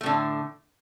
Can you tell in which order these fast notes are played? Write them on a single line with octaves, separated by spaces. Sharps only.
A3 A2 D3